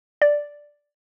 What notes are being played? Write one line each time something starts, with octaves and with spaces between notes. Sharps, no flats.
D5